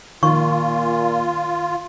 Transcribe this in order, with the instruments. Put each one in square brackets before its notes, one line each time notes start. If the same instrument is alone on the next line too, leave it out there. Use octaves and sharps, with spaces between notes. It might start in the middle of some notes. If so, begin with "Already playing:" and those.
[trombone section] A#2 [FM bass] D#3 [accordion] F4 [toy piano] C#6